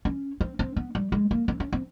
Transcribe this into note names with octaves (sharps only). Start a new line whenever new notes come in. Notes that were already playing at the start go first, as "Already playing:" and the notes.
C#4
C4
C4
B3
G3
G#3
A#3
C4
C#4
C4